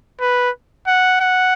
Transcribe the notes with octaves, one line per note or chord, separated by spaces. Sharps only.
B4
F#5
F#5